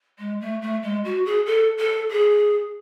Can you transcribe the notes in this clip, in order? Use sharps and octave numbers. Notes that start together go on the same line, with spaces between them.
G#3
A3
A3
G#3
F#4
G#4
A4
A4
G#4